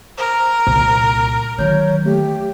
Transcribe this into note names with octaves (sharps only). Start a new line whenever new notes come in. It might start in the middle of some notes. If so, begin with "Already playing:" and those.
A#4 C5
C2 A#2
D#3 F#3 C#5 G6
A3 G4